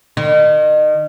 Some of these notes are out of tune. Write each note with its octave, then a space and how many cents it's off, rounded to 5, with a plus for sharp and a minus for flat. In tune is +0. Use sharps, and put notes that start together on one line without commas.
D#3 -30